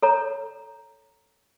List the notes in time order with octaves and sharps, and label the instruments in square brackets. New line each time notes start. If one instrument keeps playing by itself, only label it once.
[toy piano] A4 C#5 A#5